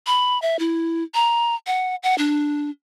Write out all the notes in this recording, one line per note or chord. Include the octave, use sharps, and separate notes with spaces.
B5
E5
E4
A#5
F#5
F#5
D4